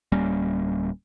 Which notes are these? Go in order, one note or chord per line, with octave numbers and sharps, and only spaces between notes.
D1 G3 A#3 C#4